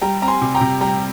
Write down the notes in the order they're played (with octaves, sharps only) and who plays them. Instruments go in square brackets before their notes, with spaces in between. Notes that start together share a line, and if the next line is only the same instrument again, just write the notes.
[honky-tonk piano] G3 [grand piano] G5 A#5
[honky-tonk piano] C4 [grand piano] A#5
[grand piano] G#5 C6
[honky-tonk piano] C3
[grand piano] G5 A#5
[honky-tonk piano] C3
[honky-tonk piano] G3 [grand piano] G5 A#5